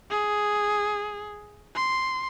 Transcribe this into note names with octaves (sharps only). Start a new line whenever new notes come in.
G#4
C6